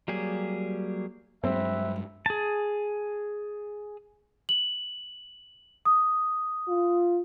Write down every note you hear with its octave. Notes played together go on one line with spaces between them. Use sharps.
F#3 G3 A#3 G4 G#4
G2 F#3 G#3 C4 B4 E5
G#4 A5
F#7
D#6
F4